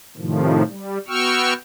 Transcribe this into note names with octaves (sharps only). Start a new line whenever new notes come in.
A2 C3 D#3 F3
G3
B3 F#4 G5 C#6 E6 F6